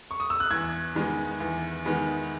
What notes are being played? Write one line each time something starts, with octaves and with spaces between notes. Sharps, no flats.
C#6
D#6
E6
F#6
E2 G#6
D#3 G#3 B3
E2
D#3 G#3 B3